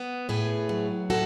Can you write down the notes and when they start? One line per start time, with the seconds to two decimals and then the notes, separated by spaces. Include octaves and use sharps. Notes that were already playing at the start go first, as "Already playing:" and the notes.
Already playing: B3
0.29 A2 G#4 B4
0.69 F#3
1.10 A2 F#4 A4